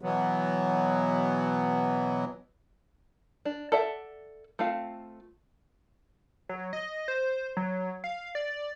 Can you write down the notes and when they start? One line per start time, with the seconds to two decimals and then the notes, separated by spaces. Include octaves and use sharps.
0.02 B2 E3 F#3 B3
3.45 D4
3.72 A4 D5 E5 F#5
4.59 A3 C4 F4 F5
6.49 F#3
6.73 D#5
7.08 C5
7.57 F#3
8.04 F5
8.35 D5